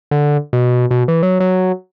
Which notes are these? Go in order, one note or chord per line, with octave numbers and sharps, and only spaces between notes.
D3
B2
B2
E3
F#3
F#3